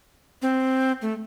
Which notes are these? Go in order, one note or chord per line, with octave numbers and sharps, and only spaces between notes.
C4
A3